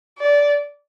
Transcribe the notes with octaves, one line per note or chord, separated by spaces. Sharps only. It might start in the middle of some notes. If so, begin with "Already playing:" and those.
D5